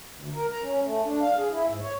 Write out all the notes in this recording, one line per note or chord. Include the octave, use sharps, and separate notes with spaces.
D2
A#4
A#5
C#4
A3
D4
F5
G#4
E4
G#2
C#5